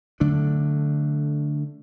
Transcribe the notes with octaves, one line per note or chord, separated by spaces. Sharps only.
D3 F#3 A3 D4